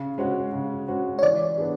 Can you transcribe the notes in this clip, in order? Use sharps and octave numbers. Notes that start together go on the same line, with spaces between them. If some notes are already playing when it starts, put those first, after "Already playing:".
Already playing: C#3
G#3 C#4 F#4
C#3
G#3 C#4 F#4
C#5
E3 D5
B3 D4 G#4